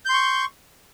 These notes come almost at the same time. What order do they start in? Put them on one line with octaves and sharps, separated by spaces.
G6 C6 C#6